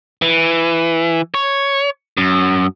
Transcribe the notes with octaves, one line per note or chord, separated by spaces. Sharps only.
E3
C#5
F#2